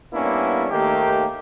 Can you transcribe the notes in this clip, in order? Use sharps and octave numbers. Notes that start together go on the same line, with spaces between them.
G3 A#3 B3 C#4 D4 E4
D#2 D#3 A3 A#3 D#4 G4